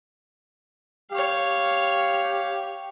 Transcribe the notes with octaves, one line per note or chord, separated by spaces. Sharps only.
G4 C#5 F5